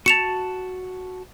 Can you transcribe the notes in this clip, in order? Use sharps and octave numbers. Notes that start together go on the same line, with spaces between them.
F#4 A5 C#7 E7 F7